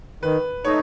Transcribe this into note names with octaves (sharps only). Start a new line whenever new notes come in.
D#3 B4
A3 D#4 C#5